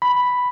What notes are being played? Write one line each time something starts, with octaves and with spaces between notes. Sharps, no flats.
B5